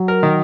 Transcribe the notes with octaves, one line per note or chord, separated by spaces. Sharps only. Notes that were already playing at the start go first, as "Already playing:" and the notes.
Already playing: F#3
A#4
D#3